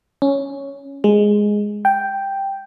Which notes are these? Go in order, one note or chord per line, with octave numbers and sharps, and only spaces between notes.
C#4
G#3
G5